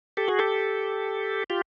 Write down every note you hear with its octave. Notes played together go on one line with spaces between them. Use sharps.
G4 A4
F#4 G#4
G4 A4
F4 G4